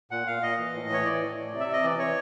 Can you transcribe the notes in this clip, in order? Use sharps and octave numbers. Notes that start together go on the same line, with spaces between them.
A#2 F#5
A#2 F5
A#2 D#5
E3
A2
E3 C#5
E3 D5
A2
A2
C3
E5
C3
D#5
E3 D5
E3 C#5